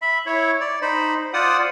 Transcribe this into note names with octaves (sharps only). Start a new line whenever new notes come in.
E5 B5
E4 C#5
D5
D#4 C5 B5
F4 C5 D5 F#5 D#6